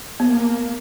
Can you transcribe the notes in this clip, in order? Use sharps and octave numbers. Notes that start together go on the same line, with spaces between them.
A#3 B3